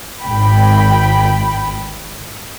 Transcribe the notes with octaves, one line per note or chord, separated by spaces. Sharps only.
G#1 G5 B5